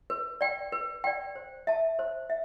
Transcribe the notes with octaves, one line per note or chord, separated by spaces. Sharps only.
B4
D5 G5
B4
D5 G5
C5
E5 A5
C5
E5